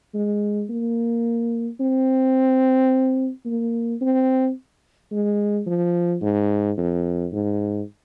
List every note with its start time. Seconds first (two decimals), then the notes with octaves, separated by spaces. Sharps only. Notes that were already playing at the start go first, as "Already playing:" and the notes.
0.14 G#3
0.69 A#3
1.80 C4
3.45 A#3
4.01 C4
5.12 G#3
5.67 F3
6.22 G#2
6.77 F2
7.32 G#2